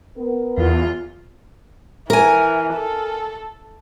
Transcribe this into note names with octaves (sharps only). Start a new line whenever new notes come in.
B3 A#4
E2 F4
E3 A#4 G#5
A4